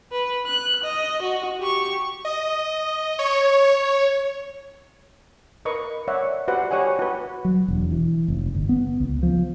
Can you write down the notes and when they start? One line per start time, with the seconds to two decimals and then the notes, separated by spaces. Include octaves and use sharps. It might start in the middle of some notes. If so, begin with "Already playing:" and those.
0.12 B4
0.46 F#6
0.84 D#5
1.22 F#4
1.59 G4 C#6
2.25 D#5
3.19 C#5
5.65 A#4 B4 D#5 C#6
6.08 C#5 D5 E5 F#5
6.48 F#4 G4 B4 C5 D5 F#5
6.71 G4 C#5 D#5 F#5 G#5
6.99 F#4 B4
7.45 F#3
7.68 E1
7.91 E3
8.28 F1
8.55 G1
8.69 B3
9.00 C#2
9.23 F3